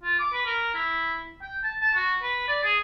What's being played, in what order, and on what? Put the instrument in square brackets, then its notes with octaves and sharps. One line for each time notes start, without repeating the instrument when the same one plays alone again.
[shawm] F4
D6
B4
A#4
E4
G5
A5
A5
F#4
B4
D5
G#4